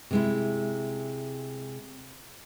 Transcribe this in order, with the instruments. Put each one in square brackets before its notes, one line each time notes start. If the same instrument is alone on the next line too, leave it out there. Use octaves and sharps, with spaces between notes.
[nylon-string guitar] C3 G#3 E4